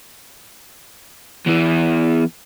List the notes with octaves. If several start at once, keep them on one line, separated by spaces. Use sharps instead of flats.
E2 E3